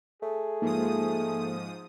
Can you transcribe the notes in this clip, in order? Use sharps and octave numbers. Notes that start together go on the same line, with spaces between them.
A3 G#4
G#2 F3 A#3 D#4 D#6